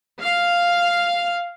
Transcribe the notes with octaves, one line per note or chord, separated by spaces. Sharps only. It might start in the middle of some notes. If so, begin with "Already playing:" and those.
F5